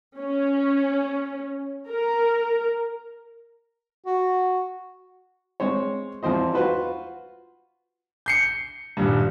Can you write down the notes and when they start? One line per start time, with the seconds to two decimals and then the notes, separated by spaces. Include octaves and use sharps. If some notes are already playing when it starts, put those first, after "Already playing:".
0.18 C#4
1.88 A#4
4.06 F#4
5.60 G#3 C4 C5 C#5
6.23 E2 F3 C4 C5 D#5
6.54 F4 F#4 B4 C5
8.26 G6 C7 C#7
8.97 D#1 G2